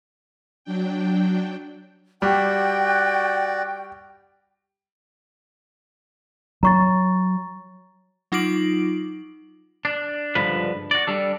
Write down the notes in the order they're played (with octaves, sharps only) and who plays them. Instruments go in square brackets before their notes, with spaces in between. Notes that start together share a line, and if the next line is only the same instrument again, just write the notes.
[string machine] F#3 D4 G5
[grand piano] G3 [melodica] F#4 D5 [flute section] G5
[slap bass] F#3 [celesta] A#5 C#6 A6
[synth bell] F#3 D#4 F4 D6 D7 F#7
[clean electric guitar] D4
C#2 G2 D3 F3 B4
F#4 D5
G3 D4 A4